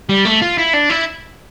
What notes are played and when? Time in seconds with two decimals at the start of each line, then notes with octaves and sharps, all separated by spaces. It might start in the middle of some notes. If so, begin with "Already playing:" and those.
0.09 G3
0.25 A3
0.42 F4
0.58 E4
0.73 D4
0.89 E4